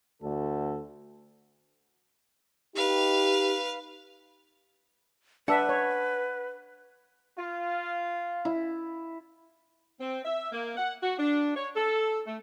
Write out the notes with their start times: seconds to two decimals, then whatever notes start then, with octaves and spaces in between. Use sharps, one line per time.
0.20 D2 D3 A4
2.76 D#4 G4 B4 F5
5.48 D4 B4 D5 E5 F#5 A5
5.69 C#5
7.37 F4
8.45 E4
9.99 C4
10.25 E5
10.52 A#3
10.77 F#5
11.03 F#4
11.18 D4
11.56 C#5
11.76 A4
12.26 A3